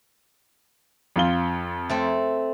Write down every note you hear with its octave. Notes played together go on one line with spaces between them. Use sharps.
F2 F4 G7
A3 C4 A4